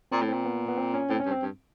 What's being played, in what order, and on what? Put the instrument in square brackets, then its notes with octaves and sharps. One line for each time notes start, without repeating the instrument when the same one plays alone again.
[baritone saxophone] A#2 [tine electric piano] C4
[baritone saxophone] A2
[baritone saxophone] A#2 [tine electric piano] C4
[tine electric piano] B3
B3
C4
C#4
[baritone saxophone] A2 [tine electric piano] C4
[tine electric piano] C#4
[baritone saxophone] G2
[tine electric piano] C4
[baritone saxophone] G2